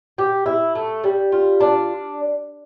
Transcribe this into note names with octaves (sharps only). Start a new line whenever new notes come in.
G4
E4
A3
G3
F4
D4